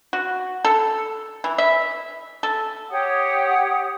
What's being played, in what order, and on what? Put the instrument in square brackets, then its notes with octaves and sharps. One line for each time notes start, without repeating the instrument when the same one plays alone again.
[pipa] F#4
A4
E3
E5
A4
[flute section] G4 C#5 F#5 D#6